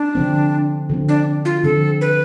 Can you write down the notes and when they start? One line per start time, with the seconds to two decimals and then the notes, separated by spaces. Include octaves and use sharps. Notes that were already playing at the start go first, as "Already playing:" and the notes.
Already playing: D4
0.15 D3 F3 C4
0.89 D3 F3 C4
1.09 D4
1.45 F4
1.64 D3 F3 C4 A4
2.01 B4